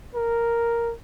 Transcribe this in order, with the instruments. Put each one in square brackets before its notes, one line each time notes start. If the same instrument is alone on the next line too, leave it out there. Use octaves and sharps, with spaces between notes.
[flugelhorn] A#4